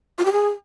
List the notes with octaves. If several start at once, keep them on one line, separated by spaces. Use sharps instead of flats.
F4
G4
G#4